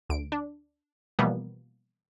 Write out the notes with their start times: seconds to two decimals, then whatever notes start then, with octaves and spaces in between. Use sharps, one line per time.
0.09 D2 D7
0.32 D4
1.19 B2 E3 F3 G3 A#3 B3